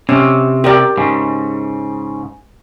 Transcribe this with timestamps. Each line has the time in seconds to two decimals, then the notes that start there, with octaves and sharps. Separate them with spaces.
0.09 C3 C#4
0.64 G4 A#4 D5
0.97 G#2 C#3